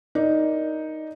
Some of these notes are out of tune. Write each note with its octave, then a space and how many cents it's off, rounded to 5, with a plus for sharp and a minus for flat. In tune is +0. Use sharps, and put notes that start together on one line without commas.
D#4 +5 A#4 +10 D5 +0